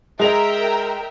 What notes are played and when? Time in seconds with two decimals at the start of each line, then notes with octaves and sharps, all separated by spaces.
0.19 G#3 A#4 E5 G5 F7